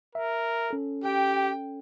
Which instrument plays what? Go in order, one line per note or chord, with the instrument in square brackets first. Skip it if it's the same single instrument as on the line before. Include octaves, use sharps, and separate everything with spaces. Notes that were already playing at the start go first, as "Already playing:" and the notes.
[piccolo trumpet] A#4 [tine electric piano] E5
[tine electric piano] C#4 A4
[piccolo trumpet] G4 [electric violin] G5